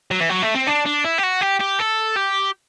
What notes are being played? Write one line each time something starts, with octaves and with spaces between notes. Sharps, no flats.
F#3
E3
F#3
A3
C4
D4
D4
E4
G4
F#4
G4
G4
A4
G4